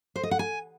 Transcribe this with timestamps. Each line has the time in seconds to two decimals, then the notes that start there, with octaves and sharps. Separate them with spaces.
0.16 C5
0.23 D#5
0.31 F#5
0.39 G#5